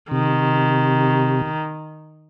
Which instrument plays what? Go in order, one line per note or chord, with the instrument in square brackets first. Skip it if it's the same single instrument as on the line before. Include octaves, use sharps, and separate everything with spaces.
[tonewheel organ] C3 [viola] D#3